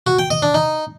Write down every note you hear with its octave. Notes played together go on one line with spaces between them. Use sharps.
F#4
G5
D#5
D4
D#4